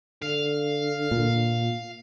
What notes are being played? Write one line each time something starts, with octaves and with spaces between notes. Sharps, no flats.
D3 F5
A#2